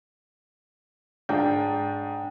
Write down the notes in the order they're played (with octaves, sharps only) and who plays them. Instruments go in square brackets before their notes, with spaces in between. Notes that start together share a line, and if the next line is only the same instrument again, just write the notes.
[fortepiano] G#2 [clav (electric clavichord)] D4 [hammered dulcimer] G5